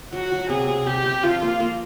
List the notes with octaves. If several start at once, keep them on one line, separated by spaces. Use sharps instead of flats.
F#3 F#4
F#3
C3 G#4
C3
C3 G4
C3
F3 F4
A#3
A#3